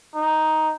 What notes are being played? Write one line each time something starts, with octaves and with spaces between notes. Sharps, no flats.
D#4